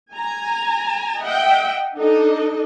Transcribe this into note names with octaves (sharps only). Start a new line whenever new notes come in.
G#5 A#5
D#5 E5 F#5 G5
D4 D#4 A4 D#5